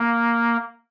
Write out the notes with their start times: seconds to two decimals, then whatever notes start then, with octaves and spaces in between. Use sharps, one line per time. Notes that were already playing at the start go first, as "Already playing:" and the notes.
Already playing: A#3